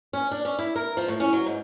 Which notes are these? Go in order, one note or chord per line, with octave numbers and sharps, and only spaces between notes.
C#4
D4
C#4
E4
A#4
F3
A2
C#4
F#3
G#2